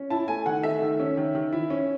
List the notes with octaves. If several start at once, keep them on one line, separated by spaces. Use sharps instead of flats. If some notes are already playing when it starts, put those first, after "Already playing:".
Already playing: C#4
E4 A5
A3 G#5
D#3 F#5
A3 E5
D#3
C#4
D#3
D#3
E4
C#4